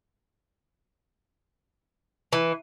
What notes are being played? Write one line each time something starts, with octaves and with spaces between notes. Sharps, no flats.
E3